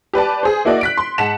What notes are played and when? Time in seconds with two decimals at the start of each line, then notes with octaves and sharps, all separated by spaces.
0.13 G4 B4 D5 A5
0.43 G#4 C5
0.65 A#3 E4 F#4 D5 D#5
0.81 F#6 B6 D7
0.97 C6
1.18 G#2 F#5 A5 B6 E7